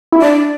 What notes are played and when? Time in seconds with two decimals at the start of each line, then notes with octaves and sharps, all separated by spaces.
0.12 E4
0.22 D4 D5